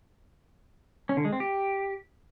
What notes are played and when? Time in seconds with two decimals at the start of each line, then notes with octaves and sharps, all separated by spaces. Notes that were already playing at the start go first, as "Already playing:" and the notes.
1.09 C#4
1.17 D3
1.25 G#3
1.32 C4
1.40 G4